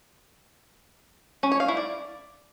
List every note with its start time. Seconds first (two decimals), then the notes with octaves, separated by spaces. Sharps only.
1.43 C#4
1.52 C#5
1.60 F5
1.68 E4
1.77 D5